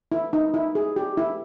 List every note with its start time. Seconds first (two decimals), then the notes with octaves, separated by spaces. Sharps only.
0.12 E4
0.33 D#4
0.54 E4
0.75 G#4
0.96 G4
1.17 E4